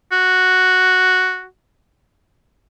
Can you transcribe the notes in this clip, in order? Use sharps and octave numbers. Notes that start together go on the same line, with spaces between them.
F#4